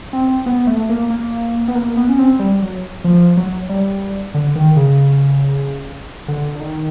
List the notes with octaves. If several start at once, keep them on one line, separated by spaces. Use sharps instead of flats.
C4
B3
A3
A#3
A#3
B3
A#3
B3
C#4
C4
G3
F#3
F3
F#3
G3
D3
D#3
C#3
D3
D3
D#3